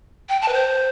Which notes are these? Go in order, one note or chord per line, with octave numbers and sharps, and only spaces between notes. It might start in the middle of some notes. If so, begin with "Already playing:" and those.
G5
A5
B4
C5